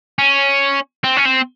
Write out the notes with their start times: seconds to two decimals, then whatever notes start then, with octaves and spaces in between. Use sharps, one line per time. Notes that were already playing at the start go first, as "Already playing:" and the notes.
0.18 C#4
1.04 C4
1.17 C#4
1.26 C4